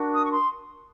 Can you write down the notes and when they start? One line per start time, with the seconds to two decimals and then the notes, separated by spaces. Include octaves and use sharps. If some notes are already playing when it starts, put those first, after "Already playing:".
Already playing: D4 F#4 A#4
0.14 D#6
0.25 C#6
0.32 C6